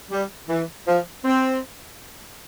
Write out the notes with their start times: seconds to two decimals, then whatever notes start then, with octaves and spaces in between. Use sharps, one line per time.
0.11 G3
0.50 E3
0.87 F3
1.25 C4